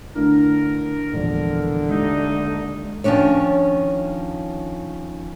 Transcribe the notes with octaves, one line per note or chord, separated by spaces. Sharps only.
D3 A3 D4 E4 A#4
E1 A#1 D3
D#2 G#3 A3 D#4
D#3 F3 C#4 D4 C#5